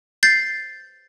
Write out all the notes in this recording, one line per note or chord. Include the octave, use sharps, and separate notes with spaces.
G6 A6 C7